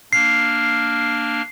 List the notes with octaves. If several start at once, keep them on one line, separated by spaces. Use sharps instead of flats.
A#3 D4 F6 C7